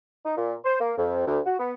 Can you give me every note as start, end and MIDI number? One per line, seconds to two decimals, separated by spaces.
0.25 0.33 63
0.37 0.54 46
0.65 0.77 72
0.80 0.92 58
0.97 1.22 41
1.26 1.39 38
1.46 1.58 66
1.59 1.73 59